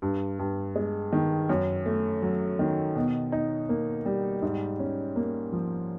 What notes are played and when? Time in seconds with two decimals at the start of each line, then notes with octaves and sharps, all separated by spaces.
0.02 G2
0.39 G2
0.76 G#3
1.13 D#3
1.49 F#2
1.86 A3
2.22 F#3
2.59 D#3
2.96 B2
3.32 D#4
3.69 A#3
4.06 G3
4.42 G#2
4.79 C#4
5.16 A#3
5.52 F3